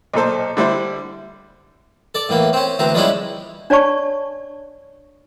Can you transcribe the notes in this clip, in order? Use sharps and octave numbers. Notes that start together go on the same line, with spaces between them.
B1 A#2 A4 C5
D3 G3 E4 C5
A4 D5
A2 E3 A#3
C4 C#4
D2 E3 C4 A#5
F3 G3 G#3 C#4 D4 E4
D4 C#5 D5 A5 C#6